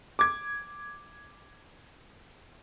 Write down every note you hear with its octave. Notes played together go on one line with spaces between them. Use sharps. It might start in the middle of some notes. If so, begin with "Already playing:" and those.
D6 G#6